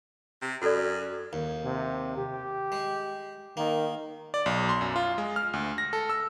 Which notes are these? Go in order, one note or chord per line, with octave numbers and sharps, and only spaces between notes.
C3
F#2 F#4 A4 D5
D#2
C3
G4
G#3
D#3 A#3
D5
B1
C6
F#2
F4
G#3
F6
D2
A#6
A4
E6